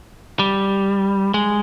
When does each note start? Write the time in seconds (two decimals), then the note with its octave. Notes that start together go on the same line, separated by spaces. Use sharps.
0.39 G3
1.34 G#3